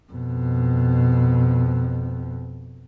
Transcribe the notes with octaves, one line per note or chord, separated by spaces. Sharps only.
F2 B2